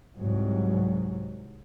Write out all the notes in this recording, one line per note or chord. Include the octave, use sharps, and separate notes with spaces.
C2 G#2 F#3